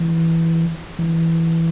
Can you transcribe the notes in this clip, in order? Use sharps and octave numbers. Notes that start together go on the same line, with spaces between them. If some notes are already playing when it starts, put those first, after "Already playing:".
Already playing: E3
E3